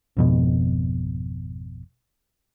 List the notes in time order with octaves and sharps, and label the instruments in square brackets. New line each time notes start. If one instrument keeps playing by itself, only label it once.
[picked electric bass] G#1 F2 B2